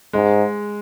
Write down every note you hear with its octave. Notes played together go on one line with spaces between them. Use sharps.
G#2 G#3